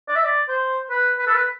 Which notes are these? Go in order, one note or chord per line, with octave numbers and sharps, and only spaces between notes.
D5
E5
D5
C5
B4
B4
A4
B4